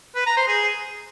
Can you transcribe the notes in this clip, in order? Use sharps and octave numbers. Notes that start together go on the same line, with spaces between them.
B4
A#5
C5
G#4